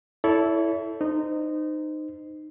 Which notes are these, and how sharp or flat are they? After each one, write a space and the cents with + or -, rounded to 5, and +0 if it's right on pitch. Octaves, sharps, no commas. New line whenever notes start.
E4 +0 A4 -5 C#5 +40
D#4 -20 C5 -25